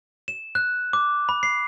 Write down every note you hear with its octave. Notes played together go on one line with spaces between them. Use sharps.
E7
F#6
D6
B5
C7